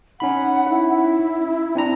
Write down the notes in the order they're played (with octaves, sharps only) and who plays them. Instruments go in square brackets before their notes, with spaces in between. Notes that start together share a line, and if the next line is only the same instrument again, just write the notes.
[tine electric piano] C#4 D#4 B5 [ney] F#5
[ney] E4
[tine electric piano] C4 D4 A#5